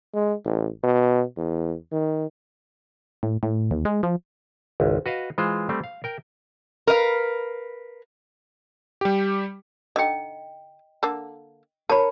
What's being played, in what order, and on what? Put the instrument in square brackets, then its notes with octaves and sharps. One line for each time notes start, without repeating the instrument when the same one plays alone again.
[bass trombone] G#3
A1
B2
E2
D#3
[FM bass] A2
A2
D#2
G#3
F3
[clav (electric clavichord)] G#1 C#2
F#4 B4 D#5 F5
E3 G#3 F4 C5
G3 A3 C4
F5
A#4 G5
[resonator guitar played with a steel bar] A#4 B4 D#5 F5
[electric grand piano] G3 G4
[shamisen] D3 D#4 [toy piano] D#5 G5
[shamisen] D3 A#3 A4
[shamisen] D#3 [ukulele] A#4 C#5 [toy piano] A5 B5